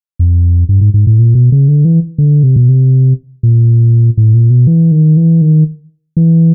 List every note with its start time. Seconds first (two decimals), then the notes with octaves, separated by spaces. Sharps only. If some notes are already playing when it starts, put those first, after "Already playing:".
0.19 F2
0.69 G2
0.81 G#2
0.94 G#2
1.07 A2
1.19 A#2
1.35 B2
1.52 C#3
1.68 D3
1.85 E3
2.18 D3
2.43 C3
2.56 B2
2.69 C3
3.43 A#2
4.17 A2
4.34 A#2
4.50 B2
4.67 E3
4.92 D#3
5.17 E3
5.42 D#3
6.17 E3